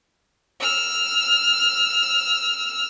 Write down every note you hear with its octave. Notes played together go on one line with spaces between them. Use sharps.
E6 F6